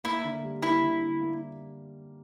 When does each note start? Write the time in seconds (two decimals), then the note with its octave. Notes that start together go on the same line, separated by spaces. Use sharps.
0.04 A#3 E4
0.24 D3
0.43 G3
0.62 A#3 E4
0.81 D3
1.01 D3
1.21 A#3